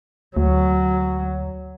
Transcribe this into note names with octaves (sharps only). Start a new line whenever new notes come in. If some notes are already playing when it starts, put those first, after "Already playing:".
D2 F#3